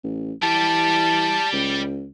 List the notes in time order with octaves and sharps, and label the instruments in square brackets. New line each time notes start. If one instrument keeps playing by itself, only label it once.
[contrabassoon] A1
[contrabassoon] E3 [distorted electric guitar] G3 G4 [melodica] A5
[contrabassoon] C#2